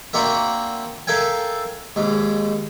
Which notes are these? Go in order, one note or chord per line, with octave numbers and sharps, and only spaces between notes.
A#3 C4 D4 F#4 A#4 E5
A4 A#4 E5 F5 G5 G#5
D#2 G#2